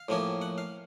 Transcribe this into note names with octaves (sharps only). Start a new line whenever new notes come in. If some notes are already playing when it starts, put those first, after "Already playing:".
Already playing: F5
A2 F3 A#3 C#4
F#5
F5